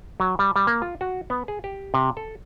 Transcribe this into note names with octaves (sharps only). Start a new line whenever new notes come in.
F#3
G3
G3
A#3
F4
F#4
B3
G#4
G4
C3
A4